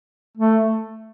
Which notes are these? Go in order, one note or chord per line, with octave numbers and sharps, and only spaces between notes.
A3